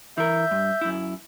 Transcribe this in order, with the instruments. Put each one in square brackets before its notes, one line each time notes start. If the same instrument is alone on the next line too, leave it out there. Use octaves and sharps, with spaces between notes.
[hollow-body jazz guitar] E3 A#4 [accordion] E5 G6
[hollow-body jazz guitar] G2
F#2 E4